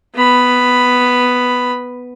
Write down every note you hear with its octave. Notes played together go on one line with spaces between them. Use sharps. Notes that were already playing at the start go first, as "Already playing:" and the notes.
B3 B5